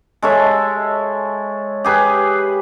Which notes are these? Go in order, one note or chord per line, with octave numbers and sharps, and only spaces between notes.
G#3 A4 C#5 E5
G4 G#4 B4